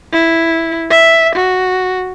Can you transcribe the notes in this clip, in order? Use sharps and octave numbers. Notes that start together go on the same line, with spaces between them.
E4
E5
F#4